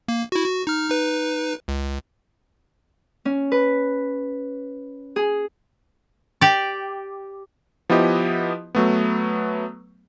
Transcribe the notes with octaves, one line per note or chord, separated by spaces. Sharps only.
A#3
E4 F#4
F#4
D#4 F6
D#4 B4
C#2
C#4
B4
G#4
G4 D5
F3 B3 E4 G4 D#5
F#3 A3 B3